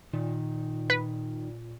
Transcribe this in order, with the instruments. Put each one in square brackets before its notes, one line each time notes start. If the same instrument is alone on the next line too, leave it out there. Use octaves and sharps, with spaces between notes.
[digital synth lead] A#2 [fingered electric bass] D#3
[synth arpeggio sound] B4